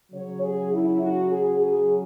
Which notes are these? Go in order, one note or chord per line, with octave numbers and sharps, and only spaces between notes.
C#3 F#3 C#5
G#4
E4
F#4
G#4
G#4